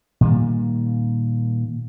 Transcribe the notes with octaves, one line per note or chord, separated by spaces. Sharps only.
A#2 D#3 G3